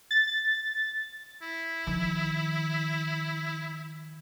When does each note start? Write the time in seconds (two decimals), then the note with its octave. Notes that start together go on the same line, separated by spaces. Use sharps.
0.11 A6
1.42 E4
1.87 D#3 F3